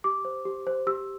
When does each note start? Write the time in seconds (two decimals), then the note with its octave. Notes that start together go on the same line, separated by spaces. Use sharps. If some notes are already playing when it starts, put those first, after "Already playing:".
0.04 G4 D6
0.25 C5
0.45 G4
0.67 C5
0.87 G4 E6